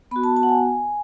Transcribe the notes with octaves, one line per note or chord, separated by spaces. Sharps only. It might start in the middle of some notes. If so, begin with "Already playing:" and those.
B3 F#4 B5
A5
A5
F#5
G#5